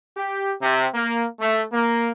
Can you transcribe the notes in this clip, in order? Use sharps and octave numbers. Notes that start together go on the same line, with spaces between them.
G4
C3
A#3
A3
A#3